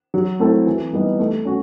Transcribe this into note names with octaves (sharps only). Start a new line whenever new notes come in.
F#3
A3 C4 E4 A4
E3
G3 B3 D#4
A3
C#4 F#4